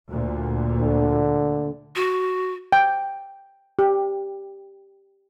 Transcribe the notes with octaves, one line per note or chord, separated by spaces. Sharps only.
D2 A#2
D3
F#4
G5
G4